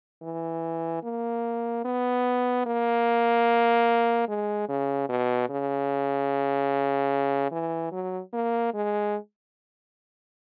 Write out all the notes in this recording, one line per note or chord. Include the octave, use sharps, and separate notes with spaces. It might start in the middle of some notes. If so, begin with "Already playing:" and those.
E3
A#3
B3
A#3
G#3
C#3
B2
C#3
E3
F#3
A#3
G#3